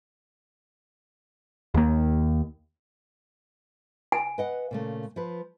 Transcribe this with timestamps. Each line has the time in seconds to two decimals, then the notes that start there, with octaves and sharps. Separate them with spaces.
1.74 D#2 A#3
4.12 G#5
4.38 B4 D#5 F#5
4.71 A#2 C#3 A3
5.16 F3 B4